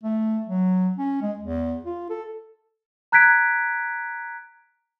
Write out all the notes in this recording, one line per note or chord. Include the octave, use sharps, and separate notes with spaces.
A3
F#3
C#4
G#3
E2
F4
A4
A#5 F#6 G#6 B6 D7